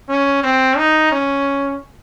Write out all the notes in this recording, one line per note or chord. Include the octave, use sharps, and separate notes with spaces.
C#4
C4
D#4
C#4